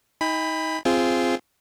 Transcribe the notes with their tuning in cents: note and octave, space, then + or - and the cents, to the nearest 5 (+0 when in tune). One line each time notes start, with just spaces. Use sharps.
D#4 +30 G5 +45 B5 +10
C4 +0 F4 -15 G#4 +0